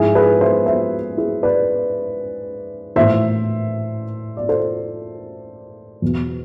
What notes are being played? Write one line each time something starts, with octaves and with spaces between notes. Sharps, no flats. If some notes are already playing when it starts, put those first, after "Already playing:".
Already playing: G#2 F3 E4 G#4
G#4 B4
C5 E5
C5 E5
E4 G#4
B4 D5
A2 E3 C5 E5
D5
A4 C5
E2 B2